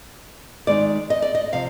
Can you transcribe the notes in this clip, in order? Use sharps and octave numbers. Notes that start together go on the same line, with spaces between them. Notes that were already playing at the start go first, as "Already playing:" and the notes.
D#3 G#3 D#4 D5
D#5
D5
D#5
C3 F3 F5